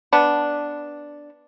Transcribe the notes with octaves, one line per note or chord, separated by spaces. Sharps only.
B3 D4